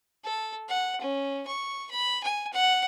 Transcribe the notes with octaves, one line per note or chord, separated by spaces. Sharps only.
A4
F#5
C#4
C#6
B5
G#5
F#5